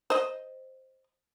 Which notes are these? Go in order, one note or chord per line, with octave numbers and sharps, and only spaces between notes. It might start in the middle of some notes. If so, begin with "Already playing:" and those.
C5 D#5